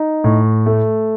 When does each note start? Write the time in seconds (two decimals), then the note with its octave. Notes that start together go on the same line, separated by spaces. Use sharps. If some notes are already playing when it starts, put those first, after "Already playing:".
Already playing: D#4
0.24 A2
0.66 A3